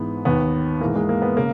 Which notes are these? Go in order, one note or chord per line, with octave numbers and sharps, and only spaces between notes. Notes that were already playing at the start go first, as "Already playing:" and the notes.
Already playing: G#2 E3 B3
D#2 D#3 B3
G#2 E3 A#3
G#3
A#3
B3
C#3 A#3